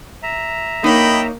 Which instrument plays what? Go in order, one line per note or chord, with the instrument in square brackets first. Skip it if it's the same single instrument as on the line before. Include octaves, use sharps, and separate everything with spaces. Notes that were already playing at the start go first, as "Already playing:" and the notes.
[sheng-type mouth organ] E5 A#5
[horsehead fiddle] A#3 [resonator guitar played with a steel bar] D#4 C#5 [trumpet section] D#5 G5 B5